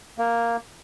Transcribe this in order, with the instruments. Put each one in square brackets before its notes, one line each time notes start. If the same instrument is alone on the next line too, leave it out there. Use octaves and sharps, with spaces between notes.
[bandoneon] A#3